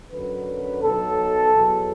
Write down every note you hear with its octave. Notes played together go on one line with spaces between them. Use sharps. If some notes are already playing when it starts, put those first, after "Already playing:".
F#2 D3 F#3 B4
B1 B2 F#3 A4
E2 B2 F#3